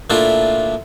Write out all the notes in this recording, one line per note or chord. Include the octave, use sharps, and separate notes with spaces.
A#2 A3 D4 E4 F4